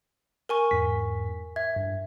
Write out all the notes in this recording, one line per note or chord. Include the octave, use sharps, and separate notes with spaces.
A#4 G#5 C#6
E2 G#2 B6
E5 G#6
G2